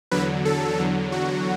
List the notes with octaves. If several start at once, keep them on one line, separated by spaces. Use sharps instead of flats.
E2 D3 F#3 B4
A4
E2 D3 F#3
F#4